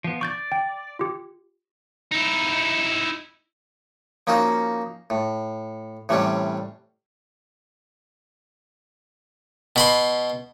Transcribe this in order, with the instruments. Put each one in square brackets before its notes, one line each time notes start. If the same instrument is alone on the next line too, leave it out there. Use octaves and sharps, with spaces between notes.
[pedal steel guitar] F3 B3
[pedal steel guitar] D5 [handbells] C#6 G6 A6
[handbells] G5
F4 G4
[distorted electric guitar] D#4 E4
[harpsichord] F3 A#3 C#4 D#4 F#4
A2
A2 C3 E3 G3 C#4
B2 B5 C6